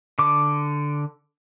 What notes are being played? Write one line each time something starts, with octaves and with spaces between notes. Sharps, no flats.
D3 D6